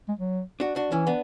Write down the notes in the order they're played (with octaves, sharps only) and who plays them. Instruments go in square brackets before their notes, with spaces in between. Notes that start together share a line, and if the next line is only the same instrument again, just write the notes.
[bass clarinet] G#3
F#3
[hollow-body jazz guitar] D4 F#4
D4 F#4
[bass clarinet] E3 [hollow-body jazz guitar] C#4 E4
[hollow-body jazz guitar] B3 D4